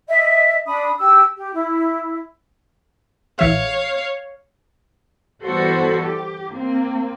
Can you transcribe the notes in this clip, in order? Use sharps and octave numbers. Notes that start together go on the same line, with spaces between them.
D#5 E5
D4 B5 D#6
G4 E6
G4
E4
A#1 E3 C#5 E5 F5
E3 G3 B3 F#4 A4 C5
G4
A#3 C4